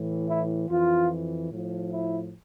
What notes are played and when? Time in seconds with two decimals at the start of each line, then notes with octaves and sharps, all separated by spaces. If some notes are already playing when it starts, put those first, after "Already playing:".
Already playing: A2 E3
0.29 E4
0.70 F2 E3 F4
1.51 A2 F3
1.92 E4